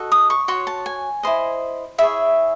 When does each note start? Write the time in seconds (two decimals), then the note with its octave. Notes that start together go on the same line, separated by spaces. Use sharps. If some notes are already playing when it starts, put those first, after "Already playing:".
Already playing: F#4 A4 D#5
0.12 D#6
0.30 C#6
0.48 F#4 C#5 C6
0.67 A5
0.86 G#5
1.23 E4 C5 D#5
1.98 E4 G#4 C#5 E5